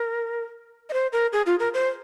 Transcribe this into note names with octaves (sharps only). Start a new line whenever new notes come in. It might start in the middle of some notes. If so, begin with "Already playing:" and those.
Already playing: A#4
D#5
C5
A#4
G#4
F4
A#4
C5